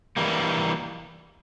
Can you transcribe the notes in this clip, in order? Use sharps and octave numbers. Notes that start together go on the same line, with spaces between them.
E3 G3 A#3